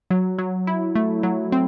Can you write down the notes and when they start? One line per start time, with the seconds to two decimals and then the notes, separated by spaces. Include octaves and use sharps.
0.10 F#3
0.38 F#3
0.67 E4
0.95 A3
1.23 F#3
1.52 C4